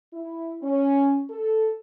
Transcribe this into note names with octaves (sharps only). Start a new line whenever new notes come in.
E4
C#4
A4